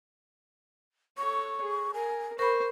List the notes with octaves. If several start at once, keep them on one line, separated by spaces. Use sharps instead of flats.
A4 C#5 C#6
G#4
A#4 G#5
A#4 C5 B5 C#6